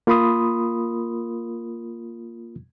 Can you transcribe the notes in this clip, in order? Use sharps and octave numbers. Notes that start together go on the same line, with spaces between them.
A#3 F4 A#4 B5 C6 D#6